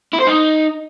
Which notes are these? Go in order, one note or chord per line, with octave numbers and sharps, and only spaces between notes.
E4
C5
D#4